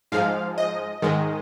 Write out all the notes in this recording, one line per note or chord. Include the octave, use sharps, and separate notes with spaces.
G#2 F3 G#3 F5
D#5
G#2 D#3 G#3